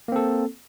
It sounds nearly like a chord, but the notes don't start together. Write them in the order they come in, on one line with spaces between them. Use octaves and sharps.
A#3 C4 A4